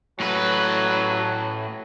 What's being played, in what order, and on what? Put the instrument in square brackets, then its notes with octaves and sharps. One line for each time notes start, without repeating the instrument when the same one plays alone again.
[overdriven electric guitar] A2 B4 [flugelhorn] F#3